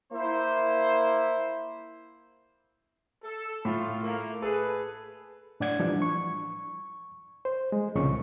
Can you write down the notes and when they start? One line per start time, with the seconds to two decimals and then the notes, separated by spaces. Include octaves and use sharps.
0.12 A#3 E4 C5
3.23 A4
3.65 A2 F4
4.02 A3 A#3
4.42 G#4 A4 B4
5.60 A2 D4 D5 F#5 G#6
5.80 E3 F3 G3 D4
6.02 C#6
7.45 C5
7.72 G#3
7.96 C2 A#2 C#3 C#6